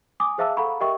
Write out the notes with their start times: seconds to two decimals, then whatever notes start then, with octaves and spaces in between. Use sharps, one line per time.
0.20 G#5 D6 D#6
0.38 G#4 C5 E5 F5 A5 E6
0.57 A4 F5 F#5 A#5 B5 C#6
0.81 G4 A#4 D#5 E5 G5 C#6